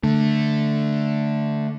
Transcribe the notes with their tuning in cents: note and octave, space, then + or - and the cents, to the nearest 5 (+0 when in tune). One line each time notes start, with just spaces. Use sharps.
D3 +0 A3 +0